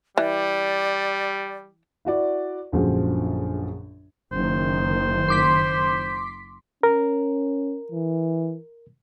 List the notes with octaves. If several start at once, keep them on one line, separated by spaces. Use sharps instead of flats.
E3 G3 D5
E4 F#4 D5
A#1 F#2 D3 F3 F#3 G#3
F#1 D#3 C5
C6 D6 B6
C#4 A#4
E3